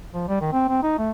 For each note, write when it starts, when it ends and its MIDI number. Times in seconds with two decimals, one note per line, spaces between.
0.13 0.27 53
0.28 0.39 55
0.41 0.48 51
0.53 0.68 60
0.69 0.80 60
0.83 0.97 63
0.98 1.11 57